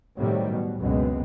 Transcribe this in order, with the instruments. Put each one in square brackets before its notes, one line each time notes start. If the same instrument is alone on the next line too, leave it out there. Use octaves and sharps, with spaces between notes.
[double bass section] A2 C3 D#3 F#3 G3
B2
C#2 F#2 B2 G#3 B3 C4